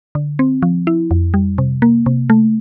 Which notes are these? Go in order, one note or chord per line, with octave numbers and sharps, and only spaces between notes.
D3
C4
F3
E4
F2
G3
C3
A#3
C3
A3